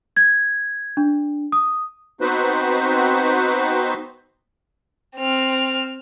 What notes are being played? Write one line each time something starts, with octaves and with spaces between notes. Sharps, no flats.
G#6
D4
D#6
B3 C4 D#4 F#4 B4 C5
C4 F6